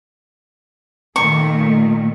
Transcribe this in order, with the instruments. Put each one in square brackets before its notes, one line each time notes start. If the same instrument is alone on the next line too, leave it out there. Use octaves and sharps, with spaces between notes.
[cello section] A#2 D#3 A3 [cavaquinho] C#6